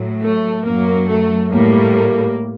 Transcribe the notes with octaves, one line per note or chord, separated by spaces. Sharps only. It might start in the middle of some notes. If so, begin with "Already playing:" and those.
Already playing: A2 F#3
A3
F#2 F#3 A#3
A3
A2 G3 A#3